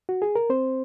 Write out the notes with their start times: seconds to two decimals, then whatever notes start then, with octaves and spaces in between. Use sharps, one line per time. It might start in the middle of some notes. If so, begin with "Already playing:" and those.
0.09 F#4
0.22 G#4
0.36 A#4
0.50 C4 C5